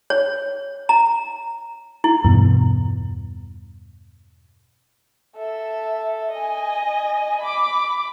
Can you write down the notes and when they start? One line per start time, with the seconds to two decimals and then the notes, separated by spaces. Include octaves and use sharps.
0.10 C#5
0.89 A#5
2.04 E4
2.24 E2 G2 B2
5.36 A4 E5
6.31 D#5 G#5
7.41 B5 D6